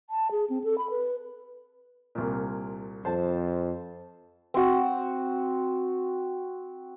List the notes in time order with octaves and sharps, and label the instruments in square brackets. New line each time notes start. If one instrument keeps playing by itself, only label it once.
[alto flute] A5
G#4
C4
A4
B5
B4
[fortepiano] C2 A#2
[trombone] F2 [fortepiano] C5 A5
[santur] C4 F#4